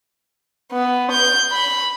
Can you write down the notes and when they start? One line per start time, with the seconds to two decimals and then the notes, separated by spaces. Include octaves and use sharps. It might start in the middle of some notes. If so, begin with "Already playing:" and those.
0.73 B3
1.12 G6
1.52 B5